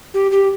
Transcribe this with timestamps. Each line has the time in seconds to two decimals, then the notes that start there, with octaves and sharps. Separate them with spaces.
0.14 G4
0.31 G4